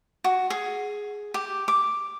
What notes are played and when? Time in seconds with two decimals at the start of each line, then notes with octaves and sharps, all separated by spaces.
0.24 F#4
0.50 G#4
1.34 G4
1.68 D6